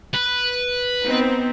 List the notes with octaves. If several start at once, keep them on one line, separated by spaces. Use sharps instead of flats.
B4
B3 C4 D#4